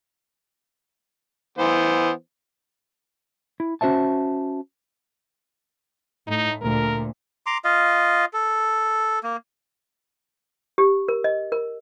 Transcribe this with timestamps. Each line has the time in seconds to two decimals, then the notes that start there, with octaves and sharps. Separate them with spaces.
1.58 E3 B3 C5
3.60 E4
3.81 C#4 F#4 C5 E5 A5
6.27 A2 D#4
6.62 D2 A#2 A#4
7.46 A#5 C6 D6
7.64 F4 D#5 F5
8.33 A4
9.23 A#3
10.78 G4
11.08 A#4
11.24 D#5
11.52 A#4